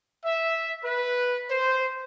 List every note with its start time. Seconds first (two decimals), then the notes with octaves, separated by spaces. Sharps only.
0.25 E5
0.84 B4
1.51 C5